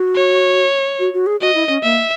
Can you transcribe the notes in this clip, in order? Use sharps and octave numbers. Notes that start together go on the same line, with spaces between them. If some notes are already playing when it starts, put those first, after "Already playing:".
Already playing: F#4
C#5
F#4
F#4
G#4
F#4 D#5
E4
C#4
A#3 E5